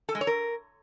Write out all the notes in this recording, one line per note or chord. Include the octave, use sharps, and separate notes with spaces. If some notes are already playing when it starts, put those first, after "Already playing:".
A4
G#3
C#5
A#4